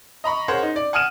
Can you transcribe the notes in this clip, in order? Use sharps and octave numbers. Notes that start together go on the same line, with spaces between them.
D#5 A#5 B5 C#6
G#4 A#4 C5 C#5 F#5
D#4
D5
F#5 G#5 D#6 F6 D#7 E7